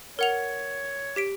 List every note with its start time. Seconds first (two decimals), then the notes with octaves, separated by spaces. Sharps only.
0.19 A#4 C#5 F#5 F7
1.16 G4 B6 D7